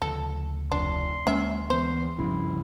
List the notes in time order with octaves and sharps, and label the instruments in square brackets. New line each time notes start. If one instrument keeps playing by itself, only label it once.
[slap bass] D2 C#3 F3 [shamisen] A4
[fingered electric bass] F1 [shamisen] D4 [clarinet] C6
[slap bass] D2 [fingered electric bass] G#3 A#3 [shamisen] C#4 E5
[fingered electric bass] E3 B3 [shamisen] C5 [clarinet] C6
[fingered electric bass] F#1 G2 C#3 [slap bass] D2 F3 D4 [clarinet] E4